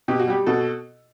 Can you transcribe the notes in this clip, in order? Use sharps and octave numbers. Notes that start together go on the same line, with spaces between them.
B2 G4
F#4
G3 G4
B2 F#4 A4